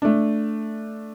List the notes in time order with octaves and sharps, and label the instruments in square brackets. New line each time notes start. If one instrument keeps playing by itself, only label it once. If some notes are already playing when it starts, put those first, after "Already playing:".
[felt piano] A3 D4